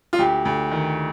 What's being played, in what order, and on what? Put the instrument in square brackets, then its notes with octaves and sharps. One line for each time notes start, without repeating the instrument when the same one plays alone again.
[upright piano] F4
D2 G4
D2
D#3